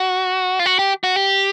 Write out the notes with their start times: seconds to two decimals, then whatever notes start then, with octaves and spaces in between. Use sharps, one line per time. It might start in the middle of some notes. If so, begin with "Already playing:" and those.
Already playing: F#4
0.59 F4
0.66 F#4
0.79 G4
1.04 F#4
1.16 G4